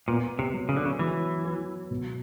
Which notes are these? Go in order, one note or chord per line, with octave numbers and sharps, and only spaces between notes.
A#2 B3
C3
F#3
C#3
D3
C#3
E3 F#3
F#4
B2